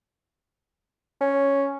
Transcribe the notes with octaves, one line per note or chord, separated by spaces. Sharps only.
C#4